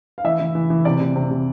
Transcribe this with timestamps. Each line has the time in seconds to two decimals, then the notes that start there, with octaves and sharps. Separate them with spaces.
0.18 F5
0.24 E3 E5
0.40 E3
0.55 E3
0.70 E3
0.85 C3 D5
1.00 C3
1.16 C3
1.30 C3